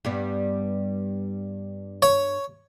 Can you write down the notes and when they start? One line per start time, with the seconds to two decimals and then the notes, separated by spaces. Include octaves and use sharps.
0.05 G2 G3 B3
2.02 C#5